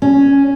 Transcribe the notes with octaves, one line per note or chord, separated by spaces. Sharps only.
C#4